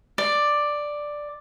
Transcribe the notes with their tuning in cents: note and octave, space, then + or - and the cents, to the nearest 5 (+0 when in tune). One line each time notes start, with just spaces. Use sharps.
D5 +5